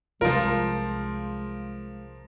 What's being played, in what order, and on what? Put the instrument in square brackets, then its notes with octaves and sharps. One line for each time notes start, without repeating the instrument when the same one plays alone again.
[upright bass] C2 [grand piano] F3 A#4 [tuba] G#3 [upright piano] F4